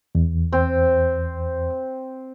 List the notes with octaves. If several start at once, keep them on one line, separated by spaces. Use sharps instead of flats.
E2
C4